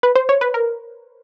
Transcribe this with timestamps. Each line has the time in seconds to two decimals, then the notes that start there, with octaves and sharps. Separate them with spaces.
0.03 B4
0.15 C5
0.29 C#5
0.41 B4
0.54 A#4